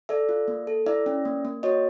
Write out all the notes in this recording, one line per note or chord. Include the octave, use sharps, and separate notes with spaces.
A4 D5 E5
F4
A#3
A4
E4 D5 E5
C#4
A#3
A#3
F#4 C#5 D#5